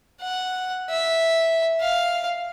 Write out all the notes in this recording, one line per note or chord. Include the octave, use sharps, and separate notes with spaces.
F#5
E5
F5